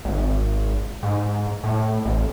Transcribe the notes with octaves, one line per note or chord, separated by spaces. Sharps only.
G#1
G#2
A2
A1